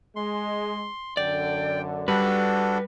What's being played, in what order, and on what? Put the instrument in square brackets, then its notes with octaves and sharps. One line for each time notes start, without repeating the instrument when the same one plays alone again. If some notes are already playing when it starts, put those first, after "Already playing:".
[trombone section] G#3 [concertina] C6
[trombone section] F#2 D3 [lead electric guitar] D5 [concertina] G5
[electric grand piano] G3 [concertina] D4 F#4 A4 [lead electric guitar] B4